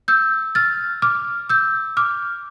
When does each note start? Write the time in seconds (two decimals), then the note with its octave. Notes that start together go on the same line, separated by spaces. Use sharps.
0.08 E6 G6
0.55 F6 A6
1.02 D6 F6
1.50 E6 G6
1.97 D6 F6